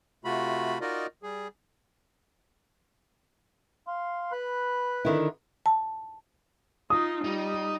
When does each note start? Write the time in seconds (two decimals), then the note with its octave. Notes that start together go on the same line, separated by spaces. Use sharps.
0.25 C3 A3 F4 F#4 B5
0.81 D#4 F4 F#4 A#4 D5 D#5
1.23 G3 G#4
3.87 F5 C6
4.32 B4 B5 F#6
5.05 D3 D#3 E4
5.66 A5
6.90 D#4 F4 D#6
7.24 G3 D#4 D#5